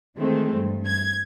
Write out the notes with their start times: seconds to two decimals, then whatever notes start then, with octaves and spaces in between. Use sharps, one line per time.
0.18 D#3 E3 G#3 A3 C4
0.54 G2
0.87 G#6